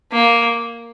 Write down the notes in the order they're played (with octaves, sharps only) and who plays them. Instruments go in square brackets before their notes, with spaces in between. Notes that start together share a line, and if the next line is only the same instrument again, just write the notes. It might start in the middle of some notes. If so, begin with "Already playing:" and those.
[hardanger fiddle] A#3